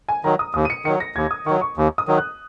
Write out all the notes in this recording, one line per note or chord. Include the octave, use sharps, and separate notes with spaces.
G#5
D#3 F#3 A#5
D#6
D#2 D#6
D#7
C#7
D#3 F#3 C#7
A#6
D#2 G#6
D#6
D#3 F#3 C#6
C#6
D#2
D#6
D#3 F#3
F#6